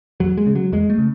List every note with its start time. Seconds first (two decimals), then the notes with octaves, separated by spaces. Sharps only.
0.20 E2 F#3
0.37 G#3
0.46 C#3
0.55 F#3
0.72 E2 G#3
0.90 A3
0.98 C#3